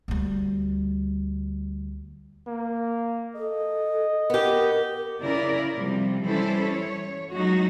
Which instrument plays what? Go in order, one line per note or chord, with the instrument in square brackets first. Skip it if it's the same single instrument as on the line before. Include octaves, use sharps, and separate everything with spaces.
[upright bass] D2 G3
[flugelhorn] A#3
[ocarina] A4 [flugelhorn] D#5
[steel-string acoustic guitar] B3 G4 [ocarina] A#4
[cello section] C#3 E4 A#4 D5
C3 F3 G3
E3 G3 C#4 E4 A4 C5
C#5
F#3 G#3 A3 D#4 F#4